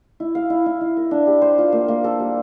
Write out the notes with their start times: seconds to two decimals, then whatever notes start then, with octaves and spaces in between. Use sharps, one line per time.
0.20 E4
0.35 F5
0.50 E4
0.66 E4
0.81 E4
0.97 A#4
1.11 D4
1.27 G4
1.42 C5
1.58 F4
1.72 A#3
1.88 A#3
2.04 A4
2.20 G3